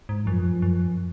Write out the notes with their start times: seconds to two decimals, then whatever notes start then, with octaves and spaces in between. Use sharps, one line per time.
0.09 G#2
0.26 F#2 F3
0.44 F2
0.62 F#2
0.80 F2